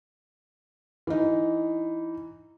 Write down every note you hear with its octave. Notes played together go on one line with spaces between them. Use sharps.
E3 D#4